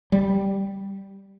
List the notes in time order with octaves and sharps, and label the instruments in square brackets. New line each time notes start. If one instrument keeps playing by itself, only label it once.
[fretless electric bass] G3